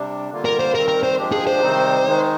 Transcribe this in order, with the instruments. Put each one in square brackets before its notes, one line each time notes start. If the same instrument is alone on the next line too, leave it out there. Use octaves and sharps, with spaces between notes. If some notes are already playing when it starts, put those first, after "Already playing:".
Already playing: [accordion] C3 G3 D4
D3 G3 A#3 F4
[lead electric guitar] A#4
C5
[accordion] D#3 G3 C4 [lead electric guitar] A#4
[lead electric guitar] A#4
C5
[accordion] F3 G#3 D4 G4
[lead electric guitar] G#4
C5
[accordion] C3 D#3 G3 C4 D#4
D#3 G#3 D#4